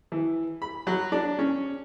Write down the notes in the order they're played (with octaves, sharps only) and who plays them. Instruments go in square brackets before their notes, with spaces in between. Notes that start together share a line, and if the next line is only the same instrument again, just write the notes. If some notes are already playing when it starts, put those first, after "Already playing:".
[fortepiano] E3
B5
F#3
D4
C#4